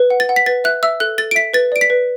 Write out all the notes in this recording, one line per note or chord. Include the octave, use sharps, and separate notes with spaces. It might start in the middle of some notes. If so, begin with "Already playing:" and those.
Already playing: B4
F#5
A6
F#5
B6
B4 A6
E5 F#6
E5 E6
A4 F#6
A4 A6
D7
E5 B6
B4 A6
D5 D7
B6
B4